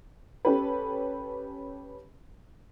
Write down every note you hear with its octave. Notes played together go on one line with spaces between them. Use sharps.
C#4 G4 A4 B4